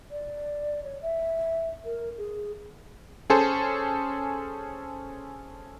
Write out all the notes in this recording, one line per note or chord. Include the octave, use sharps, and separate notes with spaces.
D5
C#5
E5
A#4
G#4
C#4 G#4 A4 C5